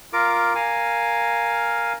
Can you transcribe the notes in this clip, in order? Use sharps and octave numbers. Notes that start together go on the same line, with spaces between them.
F4 A#4 D6
A#4 F5 G#5